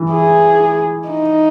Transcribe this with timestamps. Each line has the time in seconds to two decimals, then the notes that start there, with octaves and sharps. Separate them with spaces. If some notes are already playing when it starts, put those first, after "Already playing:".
Already playing: E3
0.12 G#4
1.09 D#4